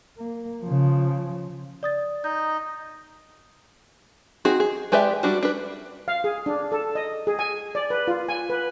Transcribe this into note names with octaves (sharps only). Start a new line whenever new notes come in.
A#3
C#3 F3
D5 D#6 A6
D#4 D#5 G6
C4 D#4 F#4 G#4
G#4
G#3 G4 B4 D5 E5
G3 D4 F#4
D4 B4
F5
G#4
D4
A4
D#5
G#4
G#5
D5
B4
F4
G#5
B4